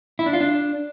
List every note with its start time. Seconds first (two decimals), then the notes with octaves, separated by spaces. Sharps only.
0.19 E4
0.26 D4
0.33 F4
0.41 D4